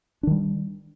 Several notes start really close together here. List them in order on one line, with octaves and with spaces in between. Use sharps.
D4 D#3 G3